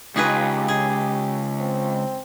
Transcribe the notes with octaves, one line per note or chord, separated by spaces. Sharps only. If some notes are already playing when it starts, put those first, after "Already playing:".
C#2 D#4 G4 G#4 B4
G#4
C4